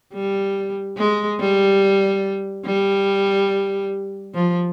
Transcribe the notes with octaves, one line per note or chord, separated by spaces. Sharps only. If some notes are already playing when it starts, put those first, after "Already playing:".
G3
G#3
G3
G3
F3